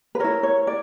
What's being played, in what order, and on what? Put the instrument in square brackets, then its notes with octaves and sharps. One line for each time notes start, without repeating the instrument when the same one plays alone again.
[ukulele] B4
E4 A#4 C#5
C#5
D5